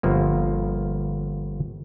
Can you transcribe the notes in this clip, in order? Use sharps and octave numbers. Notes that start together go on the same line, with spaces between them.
G1 F3 A#3